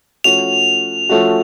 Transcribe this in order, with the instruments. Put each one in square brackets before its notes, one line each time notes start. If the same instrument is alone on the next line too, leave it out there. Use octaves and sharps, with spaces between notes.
[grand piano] F3 A3 C#4 F#4 [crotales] F7
[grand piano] F3 A3 C#4 F#4